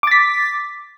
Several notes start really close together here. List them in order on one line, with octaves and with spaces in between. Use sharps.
D6 A6 B6